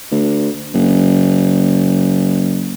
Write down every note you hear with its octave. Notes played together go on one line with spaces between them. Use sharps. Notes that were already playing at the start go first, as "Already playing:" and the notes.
D2
F#1